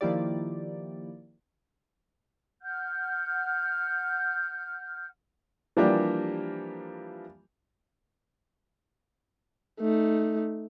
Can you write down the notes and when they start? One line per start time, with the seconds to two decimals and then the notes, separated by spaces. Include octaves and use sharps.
0.01 D#3 F3 A#3 E4 G4 D5
2.61 F#5 F6 G6
5.77 E3 F3 G3 A#3 D4 G4
9.80 A3 D#4